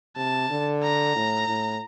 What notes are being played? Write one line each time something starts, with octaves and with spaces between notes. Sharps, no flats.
C3 A5
D3
A#5
A2
A2